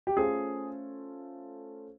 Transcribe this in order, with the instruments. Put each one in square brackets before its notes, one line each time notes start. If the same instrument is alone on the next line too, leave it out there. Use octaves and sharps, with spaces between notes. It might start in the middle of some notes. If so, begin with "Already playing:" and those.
[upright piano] G4
[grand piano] A3 C#4 F4 A4 C5 [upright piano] G#4